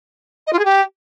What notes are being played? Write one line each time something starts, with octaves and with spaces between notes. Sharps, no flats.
D#5
F4
G#4
G4